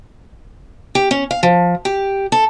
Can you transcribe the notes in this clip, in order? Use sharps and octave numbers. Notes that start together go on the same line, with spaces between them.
G4
C#4
F5
F3
G4
A4